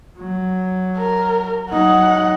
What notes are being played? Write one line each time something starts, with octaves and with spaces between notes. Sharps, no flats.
F#3
A#4
F#3 D#4 F#5